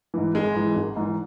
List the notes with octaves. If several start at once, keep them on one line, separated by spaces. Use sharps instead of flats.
G#2 E3
G#1 G#3
G#2 E3
G#1
G#2 E3